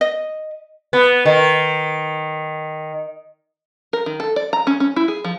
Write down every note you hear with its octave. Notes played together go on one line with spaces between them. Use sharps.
D#5
B3
D#3
A#4
D#3
A4
D5
A#5
C#4
C#4
E4
G#4
F3